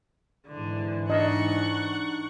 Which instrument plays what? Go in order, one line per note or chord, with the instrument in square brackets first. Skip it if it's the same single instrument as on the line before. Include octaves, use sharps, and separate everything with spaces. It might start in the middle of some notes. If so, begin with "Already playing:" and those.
[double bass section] G#2 E3 [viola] D3
[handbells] D4 D#4 D5 [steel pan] D#5 [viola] F#5 C#6